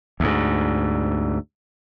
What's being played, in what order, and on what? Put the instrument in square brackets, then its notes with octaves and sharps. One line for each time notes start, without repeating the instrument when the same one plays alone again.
[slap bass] D2 G#2